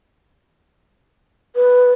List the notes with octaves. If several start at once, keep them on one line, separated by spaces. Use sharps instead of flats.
B4